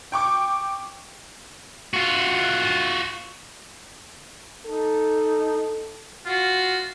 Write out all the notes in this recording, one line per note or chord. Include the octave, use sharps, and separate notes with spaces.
G5 C#6 D6
F4 F#4
D#4 A4
F4 F#4